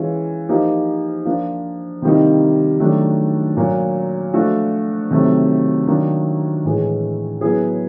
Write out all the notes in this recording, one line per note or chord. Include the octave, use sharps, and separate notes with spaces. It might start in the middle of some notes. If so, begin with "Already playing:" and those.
Already playing: E3 G#3 C#4 F4
F3 A#3 D#4 G4
F3 A#3 D4
C3 D#3 G3 A#3 D#4
D#3 F#3 A3 D4
A#2 F#3 A#3
F3 A3 D4 F#4
C3 D#3 F#3 A3
D#3 F#3 A#3 D4
A2 E3 G#3
F#3 B3 E4 G#4